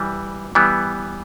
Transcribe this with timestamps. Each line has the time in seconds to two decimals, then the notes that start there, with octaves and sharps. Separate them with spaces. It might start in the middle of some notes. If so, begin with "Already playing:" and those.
Already playing: E3 G3
0.55 E3 G3 B3